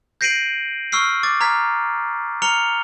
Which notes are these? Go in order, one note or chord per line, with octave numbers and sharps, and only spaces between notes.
G6 A#6 C7 D7 D#7 F#7
C#6 E6 F6 C7
D6 A6
A#5 F6 G#6 B6
A#5 F6 C#7 F7 G7